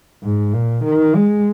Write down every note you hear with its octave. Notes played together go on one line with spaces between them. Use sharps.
G#2
A#2
D#3
G#3